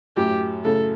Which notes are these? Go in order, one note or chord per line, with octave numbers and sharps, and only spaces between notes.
F#2 A2 G4
A2 C#3 A4